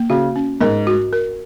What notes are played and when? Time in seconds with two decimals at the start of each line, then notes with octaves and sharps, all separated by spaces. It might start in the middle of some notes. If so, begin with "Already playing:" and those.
Already playing: A#3
0.10 C#3 F#4
0.36 C#4
0.61 G#2 A#4
0.87 F#4
1.13 A#4